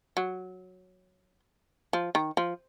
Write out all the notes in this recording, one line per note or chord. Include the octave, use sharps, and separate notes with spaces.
F#3
F3
D#3
F3